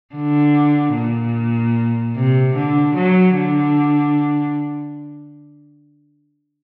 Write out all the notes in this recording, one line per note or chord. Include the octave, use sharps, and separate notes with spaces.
D3
A#2
C3
D3
F#3
D3